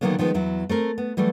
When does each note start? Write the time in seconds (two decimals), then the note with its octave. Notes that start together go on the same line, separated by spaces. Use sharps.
0.01 D3 D#3 F3 F#3 A#3 B3
0.19 D#3 F3 G#3 B3
0.34 E2 F#3 E4
0.69 A3 C4 A#4
0.98 B3
1.17 E3 F#3 G3 A3